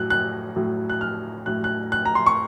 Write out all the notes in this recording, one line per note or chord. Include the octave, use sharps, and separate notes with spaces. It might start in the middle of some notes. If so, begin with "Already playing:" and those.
Already playing: A2 F#3 F#6
F#6
A2 F#3
F#6
F6
A2 F#3 F#6
F#6
F#6
A#5
C6
C#6